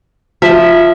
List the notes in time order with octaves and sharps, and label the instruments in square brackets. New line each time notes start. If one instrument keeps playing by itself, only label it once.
[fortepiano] F3 [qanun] E5